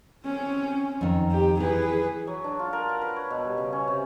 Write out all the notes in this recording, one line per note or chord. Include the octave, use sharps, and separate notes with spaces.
C4 C#4
F2 D#3
G4
E3 G#4 B4
F#3
D4
F4
A#4
F#5
B4
C#5
B2
G3
C#3
C#4
C3